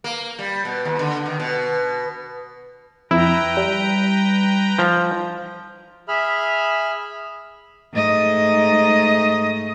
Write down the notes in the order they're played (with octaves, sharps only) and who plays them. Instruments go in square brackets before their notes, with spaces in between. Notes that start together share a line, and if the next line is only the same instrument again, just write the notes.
[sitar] A#3
G3
B2
D#2
D3
D#3
B2
[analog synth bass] F2 [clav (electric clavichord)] E4 [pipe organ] B4 G5 A#5
[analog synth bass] G3
[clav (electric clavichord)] F3
[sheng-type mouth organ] G#4 E5 B5 F6
[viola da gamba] G#2 A3 D#5